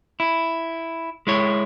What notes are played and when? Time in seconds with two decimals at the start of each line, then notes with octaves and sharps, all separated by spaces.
0.20 E4
1.27 G#3 E4 C#5